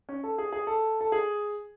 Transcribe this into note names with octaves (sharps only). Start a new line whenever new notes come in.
C#4
A4
G#4
G#4
A4
A4
G#4